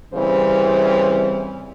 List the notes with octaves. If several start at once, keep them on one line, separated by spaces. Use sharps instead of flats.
C#3 E3 G3 C4 C5